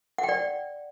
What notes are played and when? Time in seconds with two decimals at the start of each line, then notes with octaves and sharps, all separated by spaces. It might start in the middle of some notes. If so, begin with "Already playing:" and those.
0.18 F#5
0.24 G5
0.29 D5